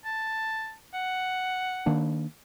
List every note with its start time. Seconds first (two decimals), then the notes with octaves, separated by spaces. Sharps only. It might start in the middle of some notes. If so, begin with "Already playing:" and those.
0.05 A5
0.94 F#5
1.86 D#3 A#3 D4